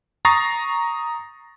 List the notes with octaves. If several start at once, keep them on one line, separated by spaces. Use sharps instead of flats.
A#5 C#6 D#6 A6 A#6 C7